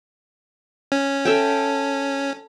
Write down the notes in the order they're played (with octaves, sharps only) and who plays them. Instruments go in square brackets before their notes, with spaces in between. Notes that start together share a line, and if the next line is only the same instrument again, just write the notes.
[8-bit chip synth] C#4
[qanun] A4 E5 G5